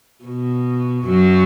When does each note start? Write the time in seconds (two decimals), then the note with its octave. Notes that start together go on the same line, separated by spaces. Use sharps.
0.24 B2
1.07 F#2 F#3